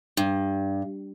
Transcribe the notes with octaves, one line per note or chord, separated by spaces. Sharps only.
G2